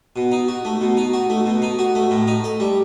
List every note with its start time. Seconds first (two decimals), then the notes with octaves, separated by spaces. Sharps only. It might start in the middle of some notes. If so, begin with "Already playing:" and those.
0.16 B2
0.32 D#4
0.48 F#4
0.65 A3
0.81 B2
0.97 D#4
1.13 F#4
1.30 A3
1.46 B2
1.62 D#4
1.79 F#4
1.95 A3
2.11 A2
2.27 D#4
2.44 A4
2.60 G3